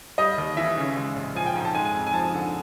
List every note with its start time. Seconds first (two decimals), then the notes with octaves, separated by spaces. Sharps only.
0.18 G3 D#5
0.38 D#2
0.57 E3 E5
0.78 C#3
0.96 G#3
1.16 A#1
1.36 F3 G#5
1.46 G5
1.56 G#2
1.65 A5
1.75 G#3 G#5
1.85 G#5
1.94 F2
2.07 G#5
2.14 F3 A5
2.34 D3